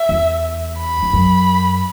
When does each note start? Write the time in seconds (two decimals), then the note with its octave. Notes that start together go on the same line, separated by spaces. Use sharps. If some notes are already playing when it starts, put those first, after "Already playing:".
Already playing: E5
0.09 E2
0.79 B5
1.03 E2
1.13 F#2